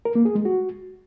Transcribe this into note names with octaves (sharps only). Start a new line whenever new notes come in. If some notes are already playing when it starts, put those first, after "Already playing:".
A#4
A#3
G#4
G#3
F#4